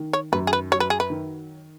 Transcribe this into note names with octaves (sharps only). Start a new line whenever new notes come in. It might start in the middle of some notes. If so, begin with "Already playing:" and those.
Already playing: D#3
C#5
F#2 B4
G#4
B4
F#3 C#5
B4
G#4
B4
D#3